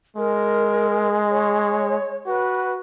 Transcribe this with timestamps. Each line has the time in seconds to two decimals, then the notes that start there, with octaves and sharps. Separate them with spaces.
0.17 G#3 A#4
1.30 C#5
2.27 F#4 B4